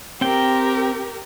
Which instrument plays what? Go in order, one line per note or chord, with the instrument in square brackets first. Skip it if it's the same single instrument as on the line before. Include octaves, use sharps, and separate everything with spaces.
[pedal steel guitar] C4 G5 [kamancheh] G4 A#4